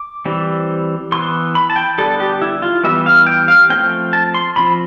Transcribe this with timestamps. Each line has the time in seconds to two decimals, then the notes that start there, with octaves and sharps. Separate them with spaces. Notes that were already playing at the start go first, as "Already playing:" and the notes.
Already playing: D6
0.25 E3 G3 C4
1.12 E3 B3 C6
1.55 B5
1.70 A5
1.76 G5
1.98 D3 G3 B3 A4
2.20 G4
2.42 E4
2.62 F4
2.84 E3 G3 B3 E5
3.06 F5
3.27 G5
3.48 F5
3.70 F3 A3 C4 G5
4.13 A5
4.34 C6
4.56 F3 C4 B5